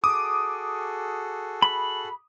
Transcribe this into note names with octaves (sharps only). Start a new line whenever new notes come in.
F#4 G#4 A4 D6 D#6
B5